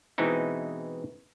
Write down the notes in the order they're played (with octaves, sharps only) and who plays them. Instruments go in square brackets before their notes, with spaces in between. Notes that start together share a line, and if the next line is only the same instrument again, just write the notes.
[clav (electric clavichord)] B2 E3 G#3 C4 D#4 E4